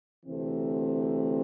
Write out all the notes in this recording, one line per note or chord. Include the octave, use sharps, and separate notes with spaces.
D2 C3 E3 A3 C4